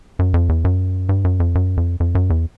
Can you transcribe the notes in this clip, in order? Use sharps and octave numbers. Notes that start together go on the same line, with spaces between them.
F#2
F2
E2
F#2
G2
F#2
F2
F#2
F2
F2
F#2
E2